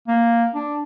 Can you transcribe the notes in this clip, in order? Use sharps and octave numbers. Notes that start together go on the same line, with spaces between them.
A#3
D4